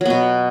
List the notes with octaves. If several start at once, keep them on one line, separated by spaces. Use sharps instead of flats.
B2 F#3 B3